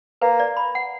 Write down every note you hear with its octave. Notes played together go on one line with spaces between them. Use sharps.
A#3 B4
D5
B5
F#5